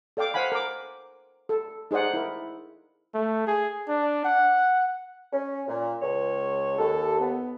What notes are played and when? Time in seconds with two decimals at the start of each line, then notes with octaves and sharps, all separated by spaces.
0.17 A4 D5 F5 G5 D6
0.34 C5 F5 F#5 G#5 B5
0.52 A#4 D6
1.49 A4
1.91 D#4 G#4 C5 D5 F#5
2.14 E4 A#4
3.14 A3
3.47 G#4
3.89 D4
4.25 F#5
5.33 C#4
5.68 A#2
6.02 C#2 C#5
6.79 D#2 A4
7.21 B3